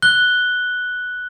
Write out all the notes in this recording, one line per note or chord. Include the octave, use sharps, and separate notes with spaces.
F#6 G7